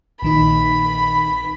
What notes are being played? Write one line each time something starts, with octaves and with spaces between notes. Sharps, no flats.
A#1 D#3 D#4 B5